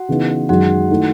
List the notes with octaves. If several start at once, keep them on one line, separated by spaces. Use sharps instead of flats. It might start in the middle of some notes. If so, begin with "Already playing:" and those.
Already playing: F#4 F#5
C#3 E3 B3 D#4
F#2 D#3 G#3 F#4 F#5
D#3 A3 E4